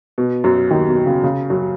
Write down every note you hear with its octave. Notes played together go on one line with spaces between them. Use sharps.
B2
F#2 F#3
D#2 D#3
B2
C#3
C#3
F#2 F#3